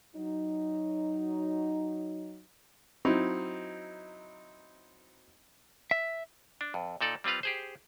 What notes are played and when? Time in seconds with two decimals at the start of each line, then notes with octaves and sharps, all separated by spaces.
0.16 F#3 D#4
3.05 F#3 C4 D#4 E4
5.91 E5
6.61 D4
6.74 F2
7.01 A#2 D#4 A4 D5
7.24 G3 C4 F4 B4 F5
7.43 G4 G#4 C5